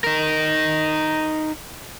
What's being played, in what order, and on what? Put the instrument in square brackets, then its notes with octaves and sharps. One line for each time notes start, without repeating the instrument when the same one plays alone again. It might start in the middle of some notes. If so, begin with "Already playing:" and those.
[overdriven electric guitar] D#4 A#4